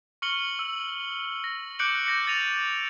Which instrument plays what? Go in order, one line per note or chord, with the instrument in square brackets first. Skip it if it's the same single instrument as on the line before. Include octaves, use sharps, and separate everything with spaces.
[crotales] C#6 F6 C#7 F#7 G7
E6
A#6
D6 F#6 G6 C#7 D7 F#7
G6 A#6 C#7
A6 A#6 D#7 F7